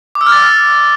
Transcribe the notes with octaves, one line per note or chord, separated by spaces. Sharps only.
D6
E6
F6
A6